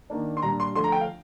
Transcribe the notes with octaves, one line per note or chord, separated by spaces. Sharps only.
D#3 A#3 D4
C6
A#2 G3 D4 A#5
C6
D3 F3 A3 D4 C6
A#5
G5
F5